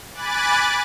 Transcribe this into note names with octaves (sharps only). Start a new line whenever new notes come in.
G#5 B5 D6 F#6 A6